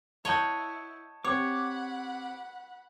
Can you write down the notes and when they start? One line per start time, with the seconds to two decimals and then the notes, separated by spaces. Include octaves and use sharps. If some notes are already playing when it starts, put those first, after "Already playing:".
0.25 E4 C#5 D#5 F#5 A5 G6
1.25 C4 G4 C#5 F#5 B5 D6